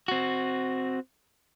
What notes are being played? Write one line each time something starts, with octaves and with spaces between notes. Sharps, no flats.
C4 F#4